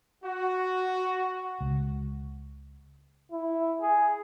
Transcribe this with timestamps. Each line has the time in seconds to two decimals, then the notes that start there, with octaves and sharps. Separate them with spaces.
0.25 F#4
1.61 C#2
3.32 E4
3.81 G#4